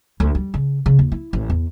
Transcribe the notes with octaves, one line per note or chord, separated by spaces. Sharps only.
D2
G3
C#3
C#3
D#2
E4
A1
E2